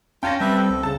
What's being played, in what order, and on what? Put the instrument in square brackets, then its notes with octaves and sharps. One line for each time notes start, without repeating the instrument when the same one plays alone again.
[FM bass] C#4 [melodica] F4 [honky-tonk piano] G5 A5 A#6
[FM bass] G3 [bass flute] C4 [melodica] B4 E5
[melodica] A4
[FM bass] C2
[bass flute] C#3 [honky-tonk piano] A5